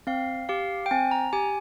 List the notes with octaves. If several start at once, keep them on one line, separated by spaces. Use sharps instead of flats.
C4 F5
G4 F5
G5
C4 G#5
A#5
G4 G#5